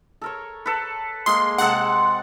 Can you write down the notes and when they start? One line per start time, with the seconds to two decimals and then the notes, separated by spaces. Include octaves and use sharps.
0.21 A4 A#4 C#5
0.66 A4 B4
1.26 G#3 A#3 G#4 C6
1.58 C3 G#3 A4 F#5